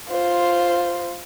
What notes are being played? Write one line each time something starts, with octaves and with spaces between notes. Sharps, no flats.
F4 C5